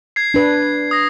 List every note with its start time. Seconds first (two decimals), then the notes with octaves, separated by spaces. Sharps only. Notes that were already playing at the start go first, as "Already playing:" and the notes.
0.16 G#6 C7
0.34 D4 B4
0.91 D#6 A#6